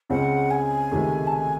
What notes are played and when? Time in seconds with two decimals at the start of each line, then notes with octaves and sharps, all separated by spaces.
0.10 C#2 C#3 G#3 C4 F#5
0.51 G#5
0.91 C#2 C3 D#3 A3
1.27 A5
1.32 G#5